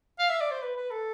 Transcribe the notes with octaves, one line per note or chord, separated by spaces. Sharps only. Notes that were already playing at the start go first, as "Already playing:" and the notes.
F5
E5
D5
C5
B4
B4
A4